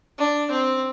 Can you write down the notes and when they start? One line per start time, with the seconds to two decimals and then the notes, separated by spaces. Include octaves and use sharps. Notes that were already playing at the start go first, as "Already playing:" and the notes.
0.18 D4
0.51 C4